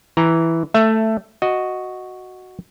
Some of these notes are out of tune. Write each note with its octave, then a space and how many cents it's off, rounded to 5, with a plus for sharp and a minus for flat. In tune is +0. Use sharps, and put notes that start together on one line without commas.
E3 +0 A#5 +0
A3 +5 E5 +15
F#4 +0 D#5 +0